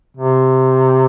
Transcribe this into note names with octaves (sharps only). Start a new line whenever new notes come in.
C3